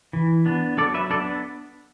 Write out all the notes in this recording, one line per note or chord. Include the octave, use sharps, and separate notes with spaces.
E3
B3 D4
F#3 A4 D5
B4 E5
B3 D4 A4 D5